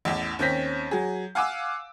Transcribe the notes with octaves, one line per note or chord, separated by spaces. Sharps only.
A1 E2
D#2 C4 C#4 G6 A#6 B6
F#3 G#4
F5 F#5 G#5 D6 E6